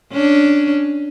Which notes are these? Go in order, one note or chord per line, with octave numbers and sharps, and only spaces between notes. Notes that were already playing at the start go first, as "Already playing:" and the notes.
C#4 D4